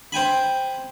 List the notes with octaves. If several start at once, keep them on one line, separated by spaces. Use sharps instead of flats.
C5 G5 G#5 B5